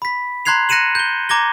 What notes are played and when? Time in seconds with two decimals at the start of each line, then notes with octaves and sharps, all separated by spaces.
0.02 B5 B6
0.45 A#5 C6 F#6 G#6 C7 F7
0.69 F#6 A#6 C#7 D#7 E7 F#7
0.95 G6 G7
1.29 A#5 D6 G#6 A#6 G7